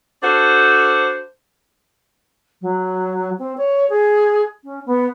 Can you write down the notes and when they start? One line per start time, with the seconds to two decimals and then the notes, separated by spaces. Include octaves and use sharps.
0.23 D4 F#4 A4 C5
2.62 F#3
3.39 C4
3.57 C#5
3.90 G#4
4.64 C#4
4.86 B3